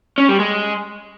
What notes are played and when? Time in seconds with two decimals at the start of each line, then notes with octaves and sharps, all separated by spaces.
0.18 C#4
0.29 G3
0.39 G#3